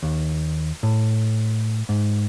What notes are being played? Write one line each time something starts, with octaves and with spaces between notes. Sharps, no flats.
D#2
A2
G#2